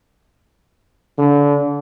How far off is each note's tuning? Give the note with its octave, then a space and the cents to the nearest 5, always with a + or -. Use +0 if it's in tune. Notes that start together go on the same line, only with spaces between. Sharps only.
D3 -30